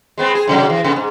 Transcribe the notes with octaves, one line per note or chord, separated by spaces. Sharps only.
G#3 B3 C4
G#4
G#2 C3 F#3
E3
C3 B3
G#2